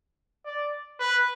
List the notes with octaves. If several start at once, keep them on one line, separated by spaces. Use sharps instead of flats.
D5
B4